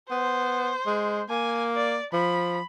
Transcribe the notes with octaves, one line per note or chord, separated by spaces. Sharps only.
B3 C5
G#3
A#3 G#5
D5
F3 B5